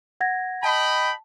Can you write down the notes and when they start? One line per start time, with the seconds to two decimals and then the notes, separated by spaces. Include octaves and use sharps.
0.21 F#5 G#6 A#6
0.63 D#5 G5 A5 B5